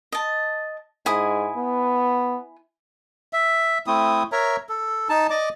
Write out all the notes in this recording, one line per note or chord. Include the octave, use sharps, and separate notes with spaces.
D#5 A5
G#2 E4 G#5 D#6
B3
E5
A3 C4 E4 D#6
A#4 C#5 E5 A#5
A4
D#4 A5
D5 D#5 D6